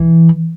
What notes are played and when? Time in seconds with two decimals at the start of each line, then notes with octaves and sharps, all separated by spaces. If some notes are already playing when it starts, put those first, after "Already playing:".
Already playing: E3